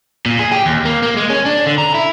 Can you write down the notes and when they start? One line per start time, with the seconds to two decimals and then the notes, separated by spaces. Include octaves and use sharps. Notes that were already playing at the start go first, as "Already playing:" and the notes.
0.26 A#2
0.39 G#4
0.52 G4
0.66 D#2
0.85 A#3
1.03 A#3
1.17 G#3
1.30 C#4
1.45 D4
1.66 D3
1.78 A#5
1.94 E4